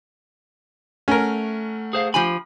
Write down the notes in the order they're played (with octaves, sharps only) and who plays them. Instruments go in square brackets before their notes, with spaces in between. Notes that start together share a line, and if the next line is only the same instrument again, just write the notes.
[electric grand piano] A3 F#5 [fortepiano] C#4 A#4
[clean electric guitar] G#4 C5 F5
[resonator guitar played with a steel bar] F3 G4 G#5 [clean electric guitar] B5